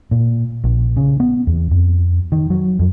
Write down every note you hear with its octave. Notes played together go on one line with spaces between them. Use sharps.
A#2
A#1
C#3
B3
E2
F2
D#3
F#3
F2